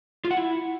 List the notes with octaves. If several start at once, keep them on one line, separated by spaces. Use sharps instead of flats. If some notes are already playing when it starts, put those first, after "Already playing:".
F4
F#5
E4